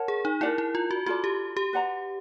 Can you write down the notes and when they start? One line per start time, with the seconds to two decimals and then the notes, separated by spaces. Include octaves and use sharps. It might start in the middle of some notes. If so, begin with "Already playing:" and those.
Already playing: A#4 C#5 F#5 A5
0.08 G#4
0.25 D#4
0.41 E4 A#4 D5 F#5
0.58 E4
0.75 F4
0.91 F#4
1.06 F4 F#4 A4 D5
1.24 G4
1.57 G4
1.73 B4 D5 F#5 A#5